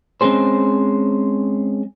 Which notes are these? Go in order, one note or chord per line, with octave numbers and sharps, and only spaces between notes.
G#3 C4 C#4 G#4 C5